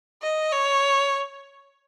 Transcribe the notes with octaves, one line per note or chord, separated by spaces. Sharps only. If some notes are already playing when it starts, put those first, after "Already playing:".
D#5
C#5